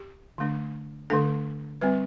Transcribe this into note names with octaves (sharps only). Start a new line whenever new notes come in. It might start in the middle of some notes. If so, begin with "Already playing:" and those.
Already playing: G4
D3 A3 D4
D3 A3 D4 A4
G3 C4 B4